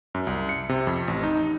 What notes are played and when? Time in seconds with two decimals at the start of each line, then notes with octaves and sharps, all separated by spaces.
0.14 F#2
0.27 C2
0.49 C#7
0.69 C3
0.87 F2
1.08 A1
1.23 D#4